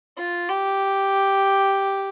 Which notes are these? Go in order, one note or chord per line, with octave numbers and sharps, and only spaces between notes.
F4
G4